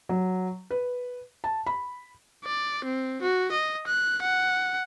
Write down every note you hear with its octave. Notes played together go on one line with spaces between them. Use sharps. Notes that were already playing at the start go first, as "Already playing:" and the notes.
F#3
B4
A5
B5
D5
C4
F#4
D#5
F#6
F#5